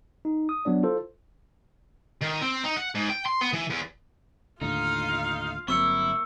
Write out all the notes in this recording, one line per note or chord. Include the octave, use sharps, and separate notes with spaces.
D#4
D#6
F#3 B3 D4 D5
E4 F4 A4 C5
D#3
C4
D#4
F#5
G#2
G5
C6
B3
E3
E2
D#2 A2 D3 D#4 F4 F5
G1 F#3 A#3 C4 E4 C#6 E6 C#7